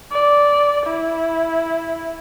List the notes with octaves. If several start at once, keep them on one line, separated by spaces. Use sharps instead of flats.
D5
E4